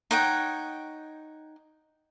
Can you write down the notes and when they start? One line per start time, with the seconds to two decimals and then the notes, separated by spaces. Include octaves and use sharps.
0.11 D#4 C#5 F#5 G5